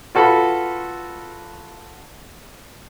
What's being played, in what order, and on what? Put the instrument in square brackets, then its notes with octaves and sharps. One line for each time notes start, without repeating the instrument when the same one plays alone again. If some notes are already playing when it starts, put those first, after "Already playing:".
[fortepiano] F4 F#4 A4 B4 B5